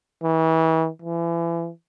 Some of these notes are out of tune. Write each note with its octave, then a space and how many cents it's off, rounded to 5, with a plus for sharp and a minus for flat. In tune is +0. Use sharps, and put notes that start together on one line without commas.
E3 -35
E3 +35